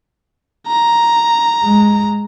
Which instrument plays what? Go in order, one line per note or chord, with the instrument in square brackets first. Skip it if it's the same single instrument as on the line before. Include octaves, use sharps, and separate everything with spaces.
[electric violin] A#5
[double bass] G#3